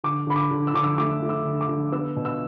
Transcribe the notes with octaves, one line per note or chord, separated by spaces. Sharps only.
D3 D6
D3 B5
D6
D3
E6
D3 D6
E6
A3 D6
A3
E6
D3
D6
D3
B3 E6
B2
E6